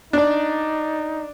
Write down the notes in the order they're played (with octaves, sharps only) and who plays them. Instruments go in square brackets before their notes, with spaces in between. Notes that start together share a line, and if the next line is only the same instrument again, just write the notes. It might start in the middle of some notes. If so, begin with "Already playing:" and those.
[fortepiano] D4 D5 [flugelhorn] D#4